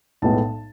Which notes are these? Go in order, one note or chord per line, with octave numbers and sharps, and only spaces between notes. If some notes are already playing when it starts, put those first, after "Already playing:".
B1 A2 G#3 B3 A5